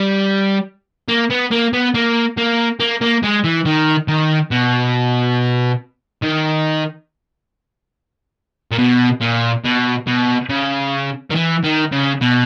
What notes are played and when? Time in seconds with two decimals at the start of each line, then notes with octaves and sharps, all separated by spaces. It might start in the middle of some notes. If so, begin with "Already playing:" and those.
Already playing: G3
1.08 A#3
1.30 B3
1.51 A#3
1.73 B3
1.94 A#3
2.37 A#3
2.80 A#3
3.01 A#3
3.23 G#3
3.44 E3
3.65 D#3
4.08 D#3
4.51 B2
6.22 D#3
8.71 A#2
8.78 B2
9.21 A#2
9.64 B2
10.07 B2
10.49 C#3
11.30 D#3
11.35 E3
11.64 D#3
11.92 C#3
12.21 B2